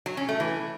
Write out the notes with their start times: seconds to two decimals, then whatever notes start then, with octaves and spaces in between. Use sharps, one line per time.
0.06 F#3
0.17 C#4
0.29 A3
0.40 E3